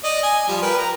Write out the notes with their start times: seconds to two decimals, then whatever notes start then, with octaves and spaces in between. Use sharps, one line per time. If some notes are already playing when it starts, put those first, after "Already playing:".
0.04 D5 D#5
0.23 G#5
0.48 F3 G3
0.62 A#4 B4 G5
0.78 A#5